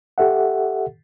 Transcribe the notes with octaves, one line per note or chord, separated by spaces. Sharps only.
G4 A4 E5 F#5